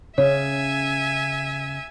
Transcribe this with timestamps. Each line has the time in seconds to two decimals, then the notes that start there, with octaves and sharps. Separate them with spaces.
0.18 C#3 C#4 C#5 E5 G#5